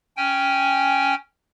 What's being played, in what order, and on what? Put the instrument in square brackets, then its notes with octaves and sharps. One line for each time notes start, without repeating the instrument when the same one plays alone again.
[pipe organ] C#4 G5 G#5